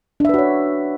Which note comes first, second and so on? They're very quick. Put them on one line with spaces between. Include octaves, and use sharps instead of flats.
D4 E5 B4 F#4 C#5